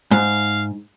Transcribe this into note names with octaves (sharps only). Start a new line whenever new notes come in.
G#2 F5